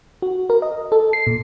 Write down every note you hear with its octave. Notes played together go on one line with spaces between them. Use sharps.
F#4
A#4
D#5
A4
C7
A#2